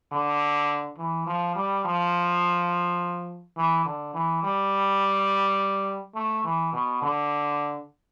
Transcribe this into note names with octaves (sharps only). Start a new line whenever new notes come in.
D3
E3
F3
G3
F3
E3
D3
E3
G3
A3
E3
B2
D3